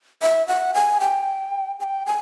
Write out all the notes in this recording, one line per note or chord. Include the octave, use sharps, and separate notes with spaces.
E5
F#5
G#5
G5
G#5
G5
G#5